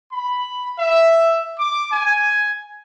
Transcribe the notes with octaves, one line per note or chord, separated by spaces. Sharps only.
B5
E5
D6
G#5